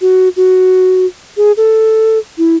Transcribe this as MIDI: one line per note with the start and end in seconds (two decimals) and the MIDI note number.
0.01 0.29 66
0.36 1.06 66
1.37 1.52 68
1.57 2.18 69
2.38 2.56 64